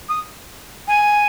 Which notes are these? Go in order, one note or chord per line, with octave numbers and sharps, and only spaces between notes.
D#6
G#5